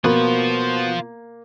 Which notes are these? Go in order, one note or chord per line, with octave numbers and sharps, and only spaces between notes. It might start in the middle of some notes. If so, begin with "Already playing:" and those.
B2 A#3 B3 F4 F#4 C5 B5